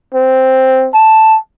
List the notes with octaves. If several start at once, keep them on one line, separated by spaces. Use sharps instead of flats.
C4
A5